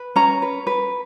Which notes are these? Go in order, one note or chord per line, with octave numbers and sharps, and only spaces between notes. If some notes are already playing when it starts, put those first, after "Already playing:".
Already playing: B4
C#4 A#5
B4
B4